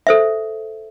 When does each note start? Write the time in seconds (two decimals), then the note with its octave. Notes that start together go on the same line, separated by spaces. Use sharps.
0.07 A4 C5 E5